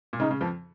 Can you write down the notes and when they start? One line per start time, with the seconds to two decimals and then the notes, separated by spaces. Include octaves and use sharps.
0.13 A#2
0.20 C#3 D#4
0.31 C#3
0.41 F2 F3